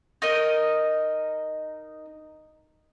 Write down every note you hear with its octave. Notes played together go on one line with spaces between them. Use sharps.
D#4 A#4 D#5